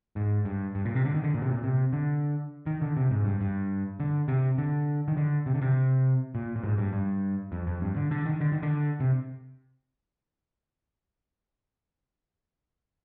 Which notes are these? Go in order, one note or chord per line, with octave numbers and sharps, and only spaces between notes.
G#2
G2
G2
A#2
C3
D3
D#3
D3
A#2
C3
A#2
C3
D3
D#3
D3
C3
G#2
G2
G2
D3
C3
D3
D#3
D3
C3
D3
C3
A#2
A#2
G#2
G2
G2
F2
F2
G2
D3
D3
D#3
D3
D#3
D3
C3